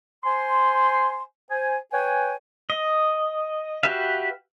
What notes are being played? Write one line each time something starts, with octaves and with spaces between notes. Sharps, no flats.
C5 G#5 C6
C5 G#5
B4 C#5 G5 G#5
D#5
F#4 G4 B4 E5 F5